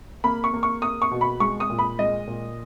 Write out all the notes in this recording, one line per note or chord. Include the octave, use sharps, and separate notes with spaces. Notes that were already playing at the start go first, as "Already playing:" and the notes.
A#3 B5
C#6
A#3
C#6
A#3 D#6
C#6
B2
B5
G#3 C#6
D#6
A#2
B5
G#3 D#5
A#2